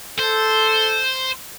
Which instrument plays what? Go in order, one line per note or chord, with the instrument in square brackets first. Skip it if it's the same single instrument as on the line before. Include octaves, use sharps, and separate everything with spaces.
[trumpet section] A4 [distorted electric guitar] C5